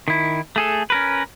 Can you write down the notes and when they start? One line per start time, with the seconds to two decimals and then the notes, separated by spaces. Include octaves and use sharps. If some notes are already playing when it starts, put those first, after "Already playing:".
0.08 D#3 E4
0.56 A3 G#4 A4
0.90 C#4 A#4 B4